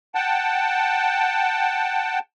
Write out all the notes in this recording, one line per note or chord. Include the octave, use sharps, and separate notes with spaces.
F#5 G5 A5